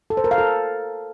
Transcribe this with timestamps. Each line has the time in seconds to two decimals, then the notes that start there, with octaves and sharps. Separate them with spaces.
0.10 A4
0.17 C5
0.24 A#4
0.31 F5
0.38 A4